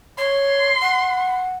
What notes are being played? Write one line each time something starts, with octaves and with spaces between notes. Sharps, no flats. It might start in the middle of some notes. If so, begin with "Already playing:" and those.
C#5 C6
F#5